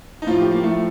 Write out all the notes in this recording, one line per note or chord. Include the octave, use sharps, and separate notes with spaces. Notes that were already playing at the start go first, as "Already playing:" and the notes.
D#4
A2 F3 F4
G4
A#3
A2 F3 A3